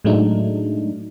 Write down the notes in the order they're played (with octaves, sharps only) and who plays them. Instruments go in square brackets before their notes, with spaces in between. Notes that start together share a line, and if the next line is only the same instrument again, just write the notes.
[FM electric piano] A2 F#3 G#3 A3 D4 D#4